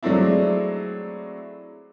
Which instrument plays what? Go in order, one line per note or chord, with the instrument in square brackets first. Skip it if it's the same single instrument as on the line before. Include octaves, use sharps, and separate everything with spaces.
[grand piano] F#3 G#3 A3 C4 D4 E4